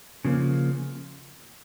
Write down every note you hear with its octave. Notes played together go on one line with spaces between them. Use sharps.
C#3 F3 A#3